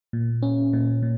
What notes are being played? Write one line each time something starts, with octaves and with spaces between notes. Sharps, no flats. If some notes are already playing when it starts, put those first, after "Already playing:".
A#2
C#4
A#2
A#2